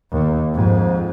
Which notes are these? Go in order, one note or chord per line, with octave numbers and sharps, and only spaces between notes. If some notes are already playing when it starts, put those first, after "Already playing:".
D#2
F2 G#2